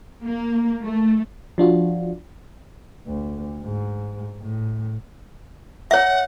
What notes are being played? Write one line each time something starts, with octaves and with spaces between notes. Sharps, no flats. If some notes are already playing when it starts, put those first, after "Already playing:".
A#3
A3
F3 D4 F4 F#4
D2
G#2
A2
C#5 E5 F#5